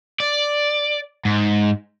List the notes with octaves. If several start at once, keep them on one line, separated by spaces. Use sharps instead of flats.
D5
G#2